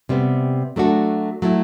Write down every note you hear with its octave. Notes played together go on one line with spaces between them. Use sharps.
C3 G3 B3
F#3 A3 D4 F#4 A4
F#3 A3 E4